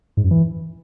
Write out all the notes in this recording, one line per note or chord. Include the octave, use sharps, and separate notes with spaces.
G#2
F#2
E3